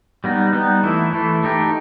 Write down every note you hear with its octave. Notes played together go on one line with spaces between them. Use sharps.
G3 B3 D#4
G3 B3 D#4
E3 A3 E4
E3 A3 E4
A3 D#4 G4